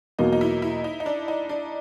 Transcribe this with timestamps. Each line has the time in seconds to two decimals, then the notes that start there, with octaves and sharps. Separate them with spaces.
0.19 E2 B2 F#3 A#3 D#4
0.32 D#4
0.41 E4
0.62 E4
0.84 D#4
1.00 D#4
1.06 D4
1.28 D#4
1.49 D4